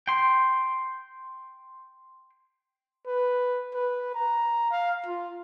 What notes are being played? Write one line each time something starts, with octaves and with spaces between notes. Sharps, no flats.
G5 C6
B4
B4
A#5
F5
F4